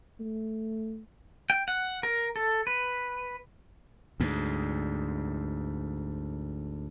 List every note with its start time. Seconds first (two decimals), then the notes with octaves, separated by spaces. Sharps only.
0.20 A3
1.50 G5
1.68 F#5
2.03 A#4
2.36 A4
2.67 B4
4.20 D2 G#2